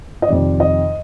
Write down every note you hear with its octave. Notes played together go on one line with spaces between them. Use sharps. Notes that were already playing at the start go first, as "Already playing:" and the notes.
D#5
F2 C3 D#3 D5
D#5